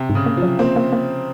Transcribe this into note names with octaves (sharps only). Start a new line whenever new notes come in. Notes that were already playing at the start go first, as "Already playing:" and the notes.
Already playing: C3
G#2
C#3
A#3
F3
F#3
A#3 C4
A#3
A#3